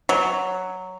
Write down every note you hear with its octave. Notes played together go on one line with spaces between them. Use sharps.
F#3